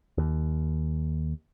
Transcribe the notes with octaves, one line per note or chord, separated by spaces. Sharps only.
D#2